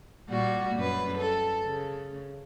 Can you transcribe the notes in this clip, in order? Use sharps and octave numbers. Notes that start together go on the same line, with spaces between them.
A#2 G3 F#4
F#2 B4
A4
C#3